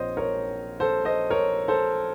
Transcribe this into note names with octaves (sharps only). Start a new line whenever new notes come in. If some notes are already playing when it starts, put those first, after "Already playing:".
Already playing: A#1 A#2 C4 C5 C#5 D#5
A#4 C#5
A4 C5
C5 D#5
A#4 C#5
A4 C5